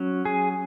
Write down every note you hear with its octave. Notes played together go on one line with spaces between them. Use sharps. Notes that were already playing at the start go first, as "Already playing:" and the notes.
Already playing: F#3 C#4
G#4